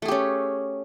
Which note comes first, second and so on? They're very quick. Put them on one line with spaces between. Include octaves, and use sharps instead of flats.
A3 G#4 G4 C#4